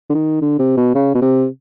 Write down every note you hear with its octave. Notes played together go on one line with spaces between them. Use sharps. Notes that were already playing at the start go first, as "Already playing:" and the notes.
D3
D#3
D3
C3
B2
C#3
B2
C3